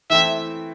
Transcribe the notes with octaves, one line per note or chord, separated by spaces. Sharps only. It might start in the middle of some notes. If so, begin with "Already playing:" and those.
E3 A3 C4 E4 A4 E5